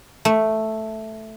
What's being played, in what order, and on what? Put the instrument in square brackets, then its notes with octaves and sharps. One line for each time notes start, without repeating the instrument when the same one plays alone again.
[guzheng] A3